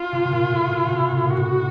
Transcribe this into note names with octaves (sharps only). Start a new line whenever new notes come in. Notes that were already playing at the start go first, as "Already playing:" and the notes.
Already playing: F4
C3
C3
A#2
A2
A#2
C#3
C3
A2
A#2
F#4
A2